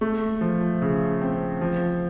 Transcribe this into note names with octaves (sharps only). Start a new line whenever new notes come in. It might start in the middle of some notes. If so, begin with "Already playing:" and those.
A3
F3
C#3
C4
F3